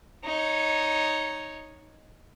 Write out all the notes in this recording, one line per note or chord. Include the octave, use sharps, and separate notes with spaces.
D#4 C#5